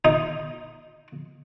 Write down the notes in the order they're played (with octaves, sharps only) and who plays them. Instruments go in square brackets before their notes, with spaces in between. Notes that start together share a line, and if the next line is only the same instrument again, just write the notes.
[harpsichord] D#4